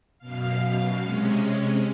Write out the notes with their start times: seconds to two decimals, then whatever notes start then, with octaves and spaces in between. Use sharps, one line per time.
0.19 F#2 B2 F5
1.00 C3 G#3 C#4